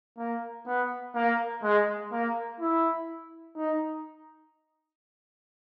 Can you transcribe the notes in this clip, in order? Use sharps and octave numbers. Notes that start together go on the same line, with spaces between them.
A#3
B3
A#3
G#3
A#3
E4
D#4